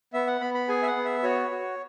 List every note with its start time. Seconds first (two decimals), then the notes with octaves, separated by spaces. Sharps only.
0.13 B3 E5
0.27 F#5
0.41 B3 B5
0.54 B5
0.68 G#4 G#5
0.83 E5
0.87 F#5
0.96 B3
1.05 E5
1.23 F#4 C#5
1.51 F#4